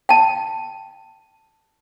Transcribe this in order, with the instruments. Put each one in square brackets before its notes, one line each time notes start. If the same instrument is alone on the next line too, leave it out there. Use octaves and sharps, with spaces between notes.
[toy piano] G5 A5